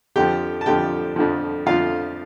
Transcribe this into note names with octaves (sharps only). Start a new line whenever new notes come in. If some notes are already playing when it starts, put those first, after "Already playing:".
F2 D3 F3 G4 G5
A5
F2 D3 F3 G4 G5
F2 D3 F3
F2 D3 F3 F4 F5